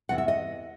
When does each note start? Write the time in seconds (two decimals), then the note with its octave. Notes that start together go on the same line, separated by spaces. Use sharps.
0.09 E2 C3 E3 F#5
0.18 E5
0.28 D#5